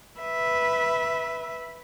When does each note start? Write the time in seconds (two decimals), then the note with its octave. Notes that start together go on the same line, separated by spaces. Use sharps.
0.20 B4 E5